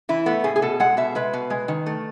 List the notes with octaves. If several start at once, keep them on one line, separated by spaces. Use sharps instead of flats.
E3 E4
A3 B3
A2 G#4
G#4
B2 A4
G#3 F#5
B2 E5
G#3 B4
B2
G#3
D#3
A3